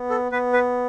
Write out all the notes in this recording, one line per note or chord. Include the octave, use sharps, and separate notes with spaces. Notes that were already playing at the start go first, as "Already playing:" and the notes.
Already playing: B3
A4
B3 B4
B4